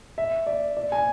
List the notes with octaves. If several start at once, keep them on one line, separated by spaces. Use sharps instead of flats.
E5
D5
D5
G#5